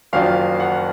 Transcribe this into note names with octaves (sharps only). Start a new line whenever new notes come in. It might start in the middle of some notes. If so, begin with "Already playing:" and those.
F#1 F2 D#3 F#3 D4 F5
F#5